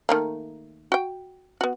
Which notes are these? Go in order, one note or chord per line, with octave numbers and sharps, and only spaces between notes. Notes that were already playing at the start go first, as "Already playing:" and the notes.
D#3 A3 A#3
F#4 G5
B3 F#4